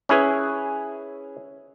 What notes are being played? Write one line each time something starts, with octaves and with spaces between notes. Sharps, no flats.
C#4 E4 G#4 B4